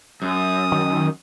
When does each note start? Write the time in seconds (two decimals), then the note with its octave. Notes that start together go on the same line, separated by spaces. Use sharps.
0.22 F#2 D#6
0.72 D#3